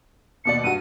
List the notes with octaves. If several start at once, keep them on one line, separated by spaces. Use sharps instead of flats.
D#2 B2 D5 C#7
G2 F#4 D#7